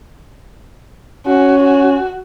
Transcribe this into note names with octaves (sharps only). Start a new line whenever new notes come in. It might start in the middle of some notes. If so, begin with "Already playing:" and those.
C#4 F#4
F#4